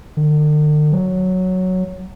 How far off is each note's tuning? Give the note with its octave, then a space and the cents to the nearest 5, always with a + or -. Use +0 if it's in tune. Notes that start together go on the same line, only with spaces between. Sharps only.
D3 +45
F#3 +0